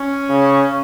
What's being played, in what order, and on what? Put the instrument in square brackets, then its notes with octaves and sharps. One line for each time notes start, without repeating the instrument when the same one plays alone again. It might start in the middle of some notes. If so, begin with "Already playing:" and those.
Already playing: [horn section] C#4
[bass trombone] C#3